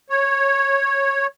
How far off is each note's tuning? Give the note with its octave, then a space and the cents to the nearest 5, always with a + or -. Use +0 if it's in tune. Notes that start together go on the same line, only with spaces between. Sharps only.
C#5 -10